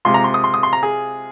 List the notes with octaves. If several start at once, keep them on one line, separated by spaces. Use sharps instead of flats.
C3 G#3 F4 C6
A#5
C6
D#6
C6
D#6
C6
A#5
G#4